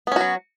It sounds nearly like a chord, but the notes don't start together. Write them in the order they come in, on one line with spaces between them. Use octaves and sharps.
B3 C#4 F#4 F#3